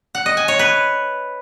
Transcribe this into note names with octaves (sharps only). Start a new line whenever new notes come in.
F#5
D#5
G#5
C#5
B4